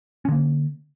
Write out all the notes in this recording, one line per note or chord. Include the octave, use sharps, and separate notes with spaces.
D3 A#3 C#4